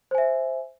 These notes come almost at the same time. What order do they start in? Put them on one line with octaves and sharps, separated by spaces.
C5 G#5 E5